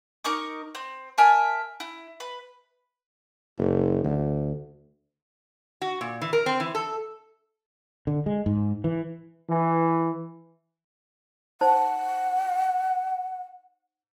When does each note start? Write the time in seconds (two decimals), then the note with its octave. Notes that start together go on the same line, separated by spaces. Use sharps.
0.24 D#4 A#4 C#6 D6
0.75 C4
1.18 A#4 E5 G#5 A5
1.80 E4
2.20 B4
3.58 F#1
4.04 D2
5.82 F#4
6.01 A#2
6.21 E3
6.33 A#4
6.46 C4
6.60 E3
6.75 A4
8.07 D3
8.26 G#3
8.46 G#2
8.84 E3
9.50 E3
11.61 D#4 C5 F#5 A5